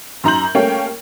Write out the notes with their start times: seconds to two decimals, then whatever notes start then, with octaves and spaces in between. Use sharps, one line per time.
0.24 F#2 D#4 A#5 C6 G6 F#7
0.55 G3 A3 A#3 C#4 C#5 G5